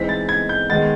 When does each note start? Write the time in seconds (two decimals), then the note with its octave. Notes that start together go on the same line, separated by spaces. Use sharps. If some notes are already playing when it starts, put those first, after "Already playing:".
Already playing: E3 G#3 C4 D#4 B6
0.09 A6
0.29 G#6
0.49 G6
0.70 D#3 G#3 B3 A6